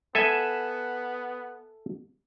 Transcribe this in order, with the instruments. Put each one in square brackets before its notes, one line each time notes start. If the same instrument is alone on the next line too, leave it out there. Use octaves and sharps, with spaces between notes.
[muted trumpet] B3 [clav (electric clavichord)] A4 E5 G#5